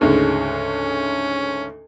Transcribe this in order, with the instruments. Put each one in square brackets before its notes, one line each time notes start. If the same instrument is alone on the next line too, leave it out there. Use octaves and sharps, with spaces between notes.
[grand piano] D2 G#2 C#3 [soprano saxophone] C#4